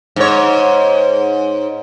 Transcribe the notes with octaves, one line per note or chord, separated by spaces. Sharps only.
G#2 C#5